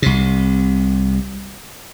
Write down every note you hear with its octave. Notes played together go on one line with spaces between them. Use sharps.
C2 C3